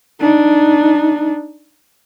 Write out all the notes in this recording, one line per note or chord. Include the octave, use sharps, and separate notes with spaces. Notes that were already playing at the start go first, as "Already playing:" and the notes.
D4 D#4